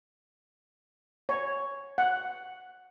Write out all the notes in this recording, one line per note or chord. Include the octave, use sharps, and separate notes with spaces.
C#5
F#5